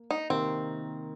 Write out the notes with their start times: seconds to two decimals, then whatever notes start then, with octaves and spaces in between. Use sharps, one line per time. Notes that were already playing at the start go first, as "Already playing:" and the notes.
Already playing: A#3
0.11 D#4
0.30 C3 D#3 A#3 C4